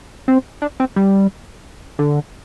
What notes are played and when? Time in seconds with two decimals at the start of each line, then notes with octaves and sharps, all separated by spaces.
0.28 C4
0.62 D4
0.80 C4
0.96 G3
1.99 D3